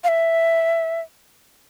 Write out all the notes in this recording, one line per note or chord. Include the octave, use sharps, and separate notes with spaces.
F5
E5